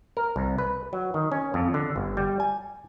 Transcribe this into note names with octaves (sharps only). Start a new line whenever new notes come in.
A#4
C2
B4
F#3
D#3
C#4
F2
D3
G1
G3
G#5